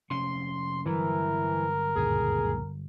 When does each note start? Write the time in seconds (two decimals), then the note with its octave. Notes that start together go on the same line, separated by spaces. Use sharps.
0.10 F1 C3 C#4 C6
0.86 G1 E3 F#3 A#4
1.96 C#2 F#2 A#2 G#4